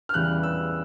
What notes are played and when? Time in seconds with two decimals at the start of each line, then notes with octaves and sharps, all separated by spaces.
0.09 F6
0.14 E2 C#3 E3 G3 F#6
0.43 E6